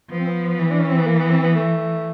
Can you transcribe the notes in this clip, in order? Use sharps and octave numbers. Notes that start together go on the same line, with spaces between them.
F3 B3
C4
B3
E3
D4
C#4
C4
B3
A#3
B3
C4
B3
A3